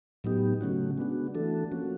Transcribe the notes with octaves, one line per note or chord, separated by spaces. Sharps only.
A2 F#3 B3 D#4 G4
C#3 F#3 A3 C#4 F#4
G#3 B3 D4 F#4
E3 A3 D4 F#4 A4
F3 A#3 C#4 F#4